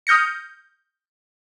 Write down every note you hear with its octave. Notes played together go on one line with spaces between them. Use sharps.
D#6 F6 G6 A#6 C#7